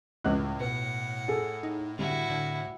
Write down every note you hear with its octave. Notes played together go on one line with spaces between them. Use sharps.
C#2 A2 D#5 F#6
B2 B4 F#5
G#4 A4 G#5
D#4
D3 G3 E4 F#4
D3